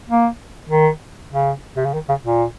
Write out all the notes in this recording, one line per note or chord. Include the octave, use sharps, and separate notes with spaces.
A#3
D#3
C#3
C3
C#3
D#3
C#3
A#2